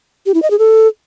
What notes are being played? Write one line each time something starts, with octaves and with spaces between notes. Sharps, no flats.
G4
E4
D#5
G#4
A4